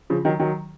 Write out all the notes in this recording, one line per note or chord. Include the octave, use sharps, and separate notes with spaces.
C#3 F3
D#3 F#3
D#3 F#3